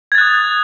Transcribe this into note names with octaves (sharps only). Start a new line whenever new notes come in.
D#6 F#6 G#6 A6